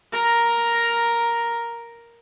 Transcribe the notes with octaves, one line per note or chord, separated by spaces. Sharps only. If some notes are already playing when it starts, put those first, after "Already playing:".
A#4 A#5